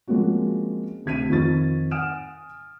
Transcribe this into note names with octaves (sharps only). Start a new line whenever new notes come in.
F3 G#3 A#3 C4 C#4 F#4
D2 C3 G#6 B6 D#7
F2 D#3 F4 C#6 A6
F#5 G#5 D#6 F6 D7 E7